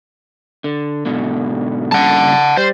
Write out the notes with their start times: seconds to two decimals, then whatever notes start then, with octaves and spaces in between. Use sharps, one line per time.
0.64 D3
1.06 G#2 B2 D3
1.92 G2 C#3 F#5 A5
2.57 G3 C5